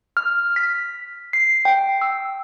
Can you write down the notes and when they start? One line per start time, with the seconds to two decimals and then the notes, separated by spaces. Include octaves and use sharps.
0.17 F6
0.56 B6
1.33 C7
1.65 G5
2.01 E6